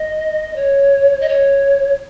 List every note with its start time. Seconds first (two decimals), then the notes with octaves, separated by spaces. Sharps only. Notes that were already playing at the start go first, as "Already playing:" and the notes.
Already playing: D#5
0.56 C#5
1.21 D#5
1.29 C#5